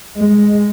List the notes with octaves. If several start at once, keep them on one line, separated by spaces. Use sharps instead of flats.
G#3